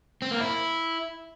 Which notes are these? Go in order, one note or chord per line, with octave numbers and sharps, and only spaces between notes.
C4
A#3
E4